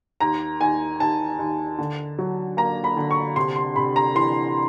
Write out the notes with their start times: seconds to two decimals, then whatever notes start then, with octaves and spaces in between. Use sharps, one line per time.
0.20 D#2 A#5
0.61 D#2 G#5
1.00 D#2 A5
1.39 D#2
1.79 D3
2.18 F#3
2.57 A#3 A#5
2.84 B5
2.97 D3
3.11 C#6
3.36 C3 C6
3.56 C6
3.76 C3 B5
3.96 A#5
4.15 E3 C6